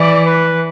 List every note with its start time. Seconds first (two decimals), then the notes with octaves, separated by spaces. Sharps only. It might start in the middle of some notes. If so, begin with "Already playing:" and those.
Already playing: E3 D5
0.26 B4